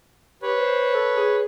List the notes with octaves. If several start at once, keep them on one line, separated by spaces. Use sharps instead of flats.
G4 B4 C#5
C5
A4
G#4